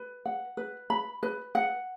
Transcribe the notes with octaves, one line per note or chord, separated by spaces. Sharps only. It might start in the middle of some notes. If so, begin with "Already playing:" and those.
Already playing: B4
F#5
B4
B5
B4
F#5